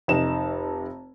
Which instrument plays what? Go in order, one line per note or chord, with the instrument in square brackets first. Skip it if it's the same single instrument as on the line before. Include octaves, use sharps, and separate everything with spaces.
[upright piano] F1 D#4 E7